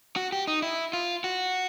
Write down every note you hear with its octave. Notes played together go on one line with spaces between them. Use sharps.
F#4
G4
D#4
E4
F4
F#4